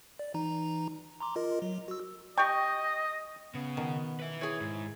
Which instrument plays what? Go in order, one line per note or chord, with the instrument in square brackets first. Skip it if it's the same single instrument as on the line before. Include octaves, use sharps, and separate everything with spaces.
[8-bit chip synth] D5
E3 D#4 A#5
A#5 C6 D6
F4 A#4 D#5
F#3
F#4 E6
[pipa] G4 C#6 [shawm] D#5 [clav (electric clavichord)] G5
[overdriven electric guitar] C#3 [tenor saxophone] B3
[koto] B2 D#3
[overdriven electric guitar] B4 E5
[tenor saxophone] E4 [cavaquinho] G#4 C#5
[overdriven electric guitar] G#2